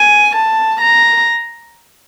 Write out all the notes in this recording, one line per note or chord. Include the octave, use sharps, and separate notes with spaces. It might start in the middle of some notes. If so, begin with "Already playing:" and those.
Already playing: G#5
A5
A#5